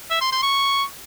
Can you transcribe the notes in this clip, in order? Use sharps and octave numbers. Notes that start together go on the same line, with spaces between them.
E5
C6
C6
C#6